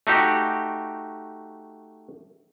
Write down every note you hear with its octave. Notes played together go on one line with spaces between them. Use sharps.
A3 D#4 F#4 G4